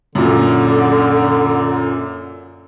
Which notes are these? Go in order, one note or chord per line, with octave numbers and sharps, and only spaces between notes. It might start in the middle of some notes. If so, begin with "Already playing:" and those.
F#2 A#2 D3